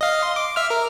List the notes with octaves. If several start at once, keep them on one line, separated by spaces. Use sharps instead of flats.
D#5 F5
C6
D6
E5 F6
A#4